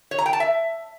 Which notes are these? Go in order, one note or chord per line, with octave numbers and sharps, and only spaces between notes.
C#5
A#5
G5
A5
E5